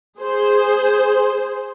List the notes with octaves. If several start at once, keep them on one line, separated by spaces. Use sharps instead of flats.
G#4 C5